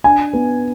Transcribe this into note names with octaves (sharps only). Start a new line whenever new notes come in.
D4 G#5
B3